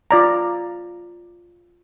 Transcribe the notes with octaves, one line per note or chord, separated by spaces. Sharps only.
F4 D5 A#5